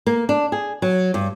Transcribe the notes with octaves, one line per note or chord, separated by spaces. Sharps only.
A#3
D4
G#4
F#3
G2